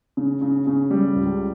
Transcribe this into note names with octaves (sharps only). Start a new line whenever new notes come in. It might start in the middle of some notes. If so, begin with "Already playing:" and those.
C#3
C#3
C#3
G3
C#2